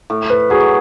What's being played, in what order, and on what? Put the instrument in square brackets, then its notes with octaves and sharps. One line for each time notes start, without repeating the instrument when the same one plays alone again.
[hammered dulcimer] A2
[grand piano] B4
[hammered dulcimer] F#3 [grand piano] G#4